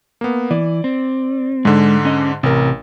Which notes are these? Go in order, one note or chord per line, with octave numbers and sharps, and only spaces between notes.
A#3 B3
E3 D5
C4
G#2 D3 G#3
C#4 D#5
A1 C3 A#4